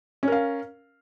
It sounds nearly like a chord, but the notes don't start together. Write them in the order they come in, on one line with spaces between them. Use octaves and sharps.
C#4 A#4 F5